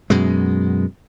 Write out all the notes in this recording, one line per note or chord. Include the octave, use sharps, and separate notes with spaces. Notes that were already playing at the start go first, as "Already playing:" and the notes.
F#2 B2 G#3